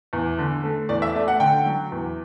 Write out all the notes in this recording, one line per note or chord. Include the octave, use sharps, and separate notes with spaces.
E2
D3
A3
E2 D5
E5
A3 D5
F#5
D3 G5
F#3
E2